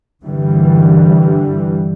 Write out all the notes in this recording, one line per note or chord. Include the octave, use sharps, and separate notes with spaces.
G2 D3 E3 G3